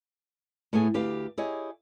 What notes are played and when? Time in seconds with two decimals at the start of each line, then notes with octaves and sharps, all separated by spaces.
0.73 A2 A3 B3 G#4
0.94 D2 G4 B4 F5
1.38 E4 G4 G#4 C#5 D#5